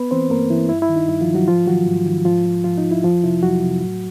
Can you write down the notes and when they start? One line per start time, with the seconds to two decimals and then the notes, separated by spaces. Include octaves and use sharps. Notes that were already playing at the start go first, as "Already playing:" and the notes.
Already playing: B3 B4
0.11 E3 C4 C5
0.30 G2 A#3 A#4
0.50 E3 E4
0.69 G2 E4
0.82 E4
0.89 D#3
0.96 D#4
1.08 G2 E4
1.21 F3 F4
1.28 D#3
1.34 F#3 F#4
1.48 G#2 F3 F4
1.67 D#3 F#3 F#4
1.86 G#2
2.06 D#3
2.25 G#2 F3 F4
2.46 F3
2.64 G#2 F3 F4
2.78 D#4
2.84 F3
2.91 E4
3.04 F2 F3 F4
3.24 C3 F3 E4
3.43 F2 F#3 F#4
3.63 C3 F3
3.82 A2